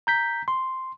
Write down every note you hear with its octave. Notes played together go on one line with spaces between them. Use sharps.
A#5 G6 B6
C6